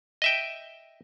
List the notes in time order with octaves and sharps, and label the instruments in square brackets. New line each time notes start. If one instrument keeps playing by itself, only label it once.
[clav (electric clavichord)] D#5 E5 G5